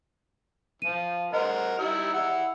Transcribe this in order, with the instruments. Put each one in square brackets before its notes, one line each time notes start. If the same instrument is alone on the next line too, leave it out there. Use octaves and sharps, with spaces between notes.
[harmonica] F3 [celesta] D#7
[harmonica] A#4 C5 F#5 [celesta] D#5
[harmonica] G3 D#4 E4
E4 F#5